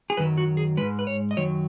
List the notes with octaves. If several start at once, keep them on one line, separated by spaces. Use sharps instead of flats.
G#4
F#2 D#3 F#3 B4
F#4
G#4
G#2 G#3 B4
B4
C#5
D#5
F#2 D#3 F#3 C#5